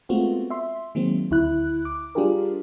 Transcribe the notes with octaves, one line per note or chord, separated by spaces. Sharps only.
G#3 A3 B3 C4 F4 F#4
E5 C6
D#3 F#3 G#3 A#3 C4
D2 E4 F#6
D6
G3 D4 F4 G4 G#4 A#4